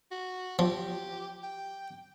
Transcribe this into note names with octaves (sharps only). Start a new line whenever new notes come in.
F#4
F3 G4
G5